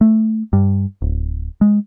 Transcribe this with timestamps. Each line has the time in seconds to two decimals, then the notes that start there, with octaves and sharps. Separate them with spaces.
0.01 A3
0.53 G2
1.02 D1
1.61 G#3